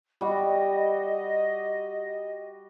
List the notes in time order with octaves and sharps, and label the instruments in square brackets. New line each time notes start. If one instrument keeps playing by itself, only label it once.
[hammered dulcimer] G3 F#4 [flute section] D#5